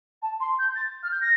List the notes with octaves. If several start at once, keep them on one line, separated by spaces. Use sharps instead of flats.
A5
C6
G6
A6
F6
G6
A#6